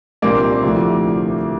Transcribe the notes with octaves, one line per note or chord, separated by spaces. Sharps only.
C2 A#2 G3 A#3 C4 D4
D2 C3 F3 A3 E4